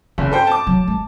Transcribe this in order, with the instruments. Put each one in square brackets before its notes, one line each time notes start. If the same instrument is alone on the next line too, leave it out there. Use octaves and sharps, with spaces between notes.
[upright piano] F#1 [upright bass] D4
[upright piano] A4 C5 G5
A5 D6
[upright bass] F#3
G#3